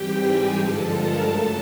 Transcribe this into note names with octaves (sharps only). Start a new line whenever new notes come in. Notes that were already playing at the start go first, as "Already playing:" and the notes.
Already playing: G#2 E3 G3 C4 G4 G5
G#4 G#5
G2 D3 F3 G#3 A4 A5
A#4 A#5
F#2 C#3 F#3 A3 A4 A5